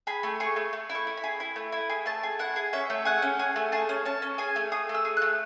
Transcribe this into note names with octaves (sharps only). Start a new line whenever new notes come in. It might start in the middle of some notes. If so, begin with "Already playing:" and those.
G#4 B5
A3
G#4 C#6
A3
A3
E4
C#6
E4
B5
G#4
E4
A3
E4
G#4
A3 A5
G#4
E4 F#5
G#4
C#4 E5
A3
G#4 F#5
C#4
G#4
A3
G#4 A5
C#4
C#4 A5
C#4
G#4 G#5
A3
G#4 D#6
A3
E6
G#4
A3 F#6